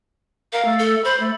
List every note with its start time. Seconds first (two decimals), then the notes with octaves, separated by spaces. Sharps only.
0.53 A#4 F5
0.65 A3
0.79 A4
1.05 C5 B5
1.20 A3